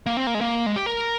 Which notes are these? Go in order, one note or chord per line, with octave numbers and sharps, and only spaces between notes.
A#3
C4
A#3
G#3
A#3
G#3
G4
A#4